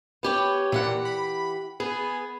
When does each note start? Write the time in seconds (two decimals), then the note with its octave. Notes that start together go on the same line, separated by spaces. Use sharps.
0.23 B3 G4 C#5
0.72 A#2 E3 G4 F#5
1.05 B5
1.80 B3 G#4